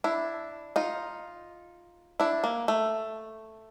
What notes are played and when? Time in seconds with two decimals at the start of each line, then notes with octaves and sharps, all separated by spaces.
0.04 D4 E4
0.76 D#4 F4
2.20 D4 E4
2.44 A#3
2.68 A3